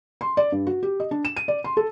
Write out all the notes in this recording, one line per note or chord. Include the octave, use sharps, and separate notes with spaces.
C6
D5
G2
F#4
G4
D#5
D4
E7
D#7
D5
C6
A4